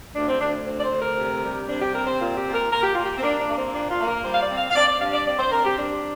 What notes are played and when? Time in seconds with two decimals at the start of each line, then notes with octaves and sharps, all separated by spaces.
0.15 D2 D4
0.28 C4
0.40 D2 D4
0.66 C4
0.79 D5
0.83 C5
0.91 D2
1.00 A#4
1.17 C3
1.43 G3
1.68 C3 D4
1.81 G4
1.93 C4 A#4
2.07 C5
2.19 A#2 F4
2.36 G4
2.46 A#2
2.54 A#4
2.71 A#2 A#4
2.81 G4
2.93 A#3 F4
3.04 G4
3.17 C4
3.22 A#3 D4
3.39 D4
3.48 A#3
3.56 C4
3.72 A#2 D4
3.90 F4
3.99 A#3
4.06 A#4
4.24 G3 C5
4.33 F5
4.41 D5
4.50 C4
4.57 F5
4.70 F5
4.74 C4 D5
4.87 D5
5.00 G2 F5
5.13 D5
5.26 C4 D5
5.38 C5
5.51 C4 A#4
5.64 G4
5.77 G3 D4